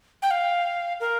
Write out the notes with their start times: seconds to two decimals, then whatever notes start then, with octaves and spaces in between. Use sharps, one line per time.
0.22 G5
0.31 F5
1.00 A#4